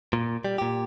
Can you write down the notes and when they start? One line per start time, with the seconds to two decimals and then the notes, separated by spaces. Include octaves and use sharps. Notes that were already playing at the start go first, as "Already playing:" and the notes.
0.13 A#2
0.45 G3
0.58 A#2 G4